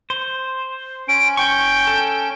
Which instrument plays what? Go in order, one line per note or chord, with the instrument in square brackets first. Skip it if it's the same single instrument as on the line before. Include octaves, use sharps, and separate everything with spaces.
[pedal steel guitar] C5
[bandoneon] C#4 [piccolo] D7
[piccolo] G5 [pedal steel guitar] C#6
[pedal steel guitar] A4